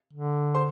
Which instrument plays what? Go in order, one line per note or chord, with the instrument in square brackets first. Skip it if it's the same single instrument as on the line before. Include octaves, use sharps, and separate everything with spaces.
[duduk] D3
[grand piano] C5 C6